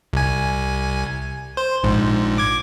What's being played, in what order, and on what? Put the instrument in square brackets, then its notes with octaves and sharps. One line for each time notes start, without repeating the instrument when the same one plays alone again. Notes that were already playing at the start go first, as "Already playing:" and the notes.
[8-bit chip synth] C2 G#5
C5
A#1 G#2
D6 G#6